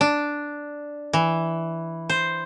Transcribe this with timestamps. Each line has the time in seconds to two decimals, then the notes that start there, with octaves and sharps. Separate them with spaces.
0.01 D4
1.13 E3
2.09 C5